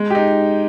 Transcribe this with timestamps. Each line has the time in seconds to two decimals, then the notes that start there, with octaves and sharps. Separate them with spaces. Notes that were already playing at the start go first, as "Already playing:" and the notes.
Already playing: G#3
0.10 D#4 G4